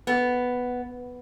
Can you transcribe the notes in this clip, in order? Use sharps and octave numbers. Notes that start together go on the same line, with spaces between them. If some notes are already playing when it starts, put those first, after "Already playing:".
B3